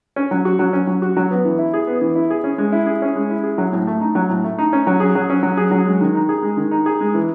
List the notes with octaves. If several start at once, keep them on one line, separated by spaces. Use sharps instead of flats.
C#4
F#3
F#4
F#3
C#4
F#3
F#4
F#3
B3
E3
E4
G#4
B3
E3
E4
G#4
C#4
G#3
E4
G#4
C#4
G#3
E4
G#4
F#3
A2
A3
D#4
F#3
A2
A3
D#4
C#4
F#3
G#4
F#3
C#4
F#3
G#4
F#3
G#3
D#3
D#4
G#4
G#3
D#3
D#4
G#4
G#3
E3